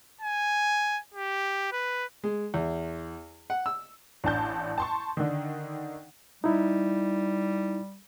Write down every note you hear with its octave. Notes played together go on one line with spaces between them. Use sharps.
G#5
G4
B4
G#3
E2
F#5
E6
A1 D4 A5 G6
A5 C6 C#6
D3 D#3
G3 D#4 E4